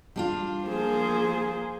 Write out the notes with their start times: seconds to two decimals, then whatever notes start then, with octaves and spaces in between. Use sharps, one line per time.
0.16 G3 D4 F4
0.65 F3 A#3 G#4 A#4 C5